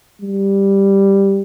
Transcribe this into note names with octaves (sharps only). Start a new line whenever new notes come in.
G3